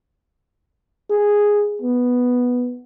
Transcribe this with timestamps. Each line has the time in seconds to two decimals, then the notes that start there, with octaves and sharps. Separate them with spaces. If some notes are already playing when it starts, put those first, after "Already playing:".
1.10 G#4
1.81 B3